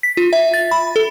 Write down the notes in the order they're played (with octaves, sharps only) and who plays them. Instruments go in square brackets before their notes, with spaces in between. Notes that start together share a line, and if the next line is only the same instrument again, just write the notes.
[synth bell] B6
F4
E5
A6
B5
A4